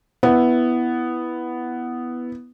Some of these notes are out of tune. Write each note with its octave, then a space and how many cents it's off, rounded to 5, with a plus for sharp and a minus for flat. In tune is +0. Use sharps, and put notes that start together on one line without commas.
B3 +0 E4 +0